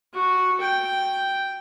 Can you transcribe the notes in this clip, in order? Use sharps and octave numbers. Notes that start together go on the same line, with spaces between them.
F#4
G5